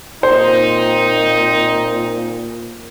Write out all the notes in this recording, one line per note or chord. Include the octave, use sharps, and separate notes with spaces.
A#2 C4 D#4 C5